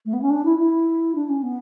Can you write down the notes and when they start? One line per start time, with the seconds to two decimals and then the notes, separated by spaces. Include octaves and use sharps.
0.06 A3
0.13 B3
0.22 C#4
0.30 D4
0.45 E4
0.59 E4
1.15 D4
1.29 C#4
1.43 B3